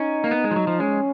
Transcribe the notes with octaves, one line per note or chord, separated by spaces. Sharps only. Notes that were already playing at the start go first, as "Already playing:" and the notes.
Already playing: C#4 D#4
A#3
B3
G#3
F3
F#3
F3
G#3 C#4